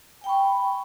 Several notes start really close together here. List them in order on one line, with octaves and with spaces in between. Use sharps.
G#5 G5 B5 C#6